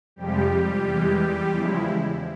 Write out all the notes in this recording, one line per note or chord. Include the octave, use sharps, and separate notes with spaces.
F2 C3 F3 G3 G#3 G4
E2 E3 G#3
G3 G4
E2 C#3 F3 G#3 E4